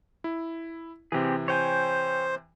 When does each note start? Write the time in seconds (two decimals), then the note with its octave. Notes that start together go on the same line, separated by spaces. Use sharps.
0.24 E4
1.12 C3 E3 C4 G4 G#4
1.48 C5 C#5 G5 G#5